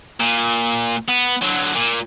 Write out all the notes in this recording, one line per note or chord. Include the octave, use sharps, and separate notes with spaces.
A#2
B3
D3 F#3
A#2